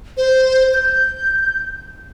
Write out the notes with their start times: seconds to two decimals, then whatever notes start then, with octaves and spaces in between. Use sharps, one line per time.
0.17 C5
0.74 G6